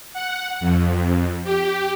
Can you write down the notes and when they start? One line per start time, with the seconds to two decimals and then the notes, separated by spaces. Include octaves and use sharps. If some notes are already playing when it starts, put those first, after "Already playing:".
0.13 F#5
0.60 F2
1.44 G4